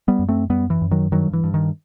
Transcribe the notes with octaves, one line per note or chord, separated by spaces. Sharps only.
G3 B3
F#2
A3 C4
F#2 G3 B3
E3
F#2
D#3 F#3
G2 D#3 F#3
E3
G2
D#3